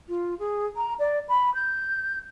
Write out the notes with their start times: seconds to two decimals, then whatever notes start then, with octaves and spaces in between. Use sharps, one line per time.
0.09 F4
0.39 G#4
0.77 A#5
0.99 D5
1.29 B5
1.55 G6